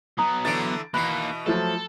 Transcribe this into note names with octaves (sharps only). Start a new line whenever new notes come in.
F#3 B3 A#5 D#6
D3 E3 A3 A6 D7
B2 E3 A#3 D#4 B5 F#6
F3 F#3 A3 A4